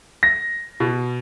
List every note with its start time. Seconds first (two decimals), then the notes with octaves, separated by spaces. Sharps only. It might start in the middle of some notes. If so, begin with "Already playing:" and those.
0.23 A#6
0.80 B2